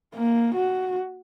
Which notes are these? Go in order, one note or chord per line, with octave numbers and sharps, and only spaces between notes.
A#3
F#4